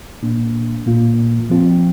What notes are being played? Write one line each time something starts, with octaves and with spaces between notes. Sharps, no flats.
A#2 A#3 D4
A#2 A#3 F4
F3 C4 F4